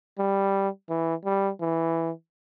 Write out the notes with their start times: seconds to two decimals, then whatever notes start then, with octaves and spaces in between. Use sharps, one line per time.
0.19 G3
0.90 E3
1.25 G3
1.61 E3